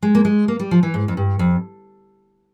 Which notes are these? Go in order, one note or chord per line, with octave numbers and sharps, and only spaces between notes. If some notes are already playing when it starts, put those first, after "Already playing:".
G#3
A#3
G#3
A#3
G3
F3
E3
G#2
F2
G2
F2